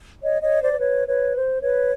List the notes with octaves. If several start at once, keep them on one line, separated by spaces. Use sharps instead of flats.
C#5 D#5
C#5 D#5
C5 D5
C5
B4 C#5
B4 C#5
C5
B4 C#5